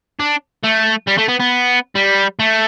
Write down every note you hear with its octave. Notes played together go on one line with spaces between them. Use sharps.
D4
A3
G3
A3
B3
B3
G3
A3